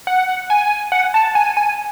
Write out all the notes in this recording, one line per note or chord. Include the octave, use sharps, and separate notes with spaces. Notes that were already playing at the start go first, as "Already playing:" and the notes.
F#5
G#5
F#5
A5
G#5
G#5